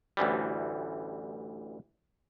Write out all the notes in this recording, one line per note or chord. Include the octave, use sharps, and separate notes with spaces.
A1 D2 E3 G3